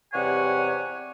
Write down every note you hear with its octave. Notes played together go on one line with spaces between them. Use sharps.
E2 C3 G3 C#5 F#5 G#5